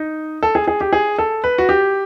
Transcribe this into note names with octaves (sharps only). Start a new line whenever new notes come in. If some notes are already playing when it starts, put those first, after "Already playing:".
Already playing: D#4
A4
G#4
G#4
G4
G#4
A4
B4
F#4
G4